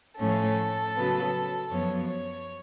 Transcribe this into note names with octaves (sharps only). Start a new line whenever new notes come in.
A2 F3 A3 C#4 A4
C#3 F#3 B3
F#2 F3 B3 C#5
C#5